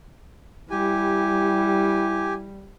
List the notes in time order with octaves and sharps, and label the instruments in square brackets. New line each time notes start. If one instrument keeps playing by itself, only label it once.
[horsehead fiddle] G3 [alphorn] E4 [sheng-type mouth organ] G4 G#5